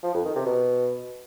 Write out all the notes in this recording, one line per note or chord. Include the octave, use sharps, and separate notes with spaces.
F3
F2
D#3
C3
B2